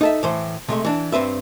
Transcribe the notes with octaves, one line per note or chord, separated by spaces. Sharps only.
D#4 A4 E5
A2 E3 C5
C3 G#3 A3
E3 D4
G2 C4 B4 E5